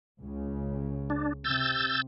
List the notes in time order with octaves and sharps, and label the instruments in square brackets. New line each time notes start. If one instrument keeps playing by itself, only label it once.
[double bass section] C#2 C#3
[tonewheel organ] D4
[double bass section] C3 [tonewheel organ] E6 G6 A6